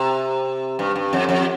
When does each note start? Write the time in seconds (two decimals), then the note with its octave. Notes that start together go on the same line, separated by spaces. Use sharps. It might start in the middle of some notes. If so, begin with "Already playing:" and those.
Already playing: C3
0.79 G2
0.96 G2
1.13 F2
1.29 F2